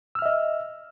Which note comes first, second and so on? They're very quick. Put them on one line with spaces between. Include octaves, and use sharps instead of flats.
E6 F6 E5 D#5